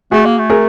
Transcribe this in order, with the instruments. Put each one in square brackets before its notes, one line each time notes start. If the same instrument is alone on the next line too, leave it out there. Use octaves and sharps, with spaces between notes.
[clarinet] A3 [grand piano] F#4 G#4
[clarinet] A#3
A3
[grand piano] G#4 A#4